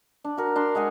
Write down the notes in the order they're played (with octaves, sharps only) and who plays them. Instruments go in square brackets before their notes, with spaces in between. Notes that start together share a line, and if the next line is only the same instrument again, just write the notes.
[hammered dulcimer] D4
F#4 A#4
D4 C6
G#3 G#4 F#5 G#5